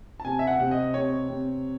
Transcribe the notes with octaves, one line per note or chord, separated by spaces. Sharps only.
A5
C3 G#5
E5
F#5
C3
D#5
C3 C#5
C3